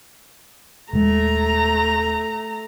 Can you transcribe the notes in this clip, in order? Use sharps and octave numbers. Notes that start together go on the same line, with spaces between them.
D#1 G#3 A3 A#5